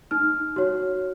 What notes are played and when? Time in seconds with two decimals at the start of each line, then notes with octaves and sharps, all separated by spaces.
0.11 D#4 F6
0.56 F#4 C#5